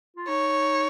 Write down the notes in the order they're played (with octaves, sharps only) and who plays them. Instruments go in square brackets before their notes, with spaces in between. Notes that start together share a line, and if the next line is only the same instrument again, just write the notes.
[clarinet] F4
[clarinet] D#4 [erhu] C#5